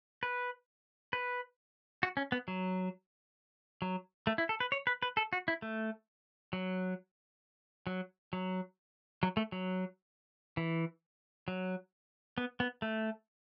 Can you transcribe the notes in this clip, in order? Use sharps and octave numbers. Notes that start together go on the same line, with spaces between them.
B4
B4
F#4
C#4
B3
F#3
F#3
A3
E4
A4
B4
C#5
B4
B4
A4
F#4
E4
A3
F#3
F#3
F#3
F#3
A3
F#3
E3
F#3
B3
B3
A3